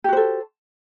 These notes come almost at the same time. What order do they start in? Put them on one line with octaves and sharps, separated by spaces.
G4 F#4 C5 A4